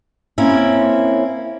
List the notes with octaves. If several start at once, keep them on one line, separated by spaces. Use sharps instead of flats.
A#3 C4 C#4 E4